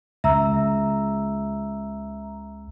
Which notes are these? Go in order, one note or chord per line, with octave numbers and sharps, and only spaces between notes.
C#2 E5 A#5 E6